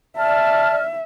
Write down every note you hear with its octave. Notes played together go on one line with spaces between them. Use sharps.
D5 E5 A5 F6